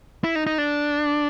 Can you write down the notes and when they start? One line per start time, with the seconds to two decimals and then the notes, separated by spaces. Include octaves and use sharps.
0.24 E4
0.36 D#4
0.47 D#4
0.58 D4